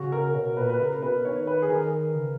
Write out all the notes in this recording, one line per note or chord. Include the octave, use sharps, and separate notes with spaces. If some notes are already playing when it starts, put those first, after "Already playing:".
Already playing: C#3 F#4
A#4
B2 C#5
A#2 B4
B4
C#3 A#4
B2 B4
D#3 C#5
B4
G#4
D#3 A#4
C#3